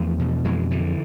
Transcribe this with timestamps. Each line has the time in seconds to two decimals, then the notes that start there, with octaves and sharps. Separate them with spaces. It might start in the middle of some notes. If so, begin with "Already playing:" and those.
Already playing: E2 F3 A3
0.19 B2
0.45 F2 E3 G#3
0.71 D3 E3